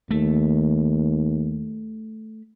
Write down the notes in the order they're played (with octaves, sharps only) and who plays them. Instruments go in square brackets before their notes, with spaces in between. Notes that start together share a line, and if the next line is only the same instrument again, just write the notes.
[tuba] D#2 [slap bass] A3